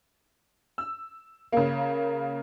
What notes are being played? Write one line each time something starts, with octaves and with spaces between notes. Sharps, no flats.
E6
C#3 A#3